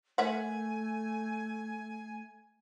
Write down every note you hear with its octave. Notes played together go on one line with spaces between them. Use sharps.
A3 A#4 E5 F#5 G#5